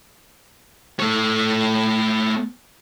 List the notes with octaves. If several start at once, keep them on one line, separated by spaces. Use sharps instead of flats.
A3 C#5